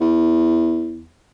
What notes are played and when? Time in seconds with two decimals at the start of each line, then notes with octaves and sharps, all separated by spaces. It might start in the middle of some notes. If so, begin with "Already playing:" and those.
0.01 E2